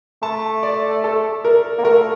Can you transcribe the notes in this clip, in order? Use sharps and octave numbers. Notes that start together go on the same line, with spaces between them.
A3 A5
D5
A4
A#4
A#3
A3 A#4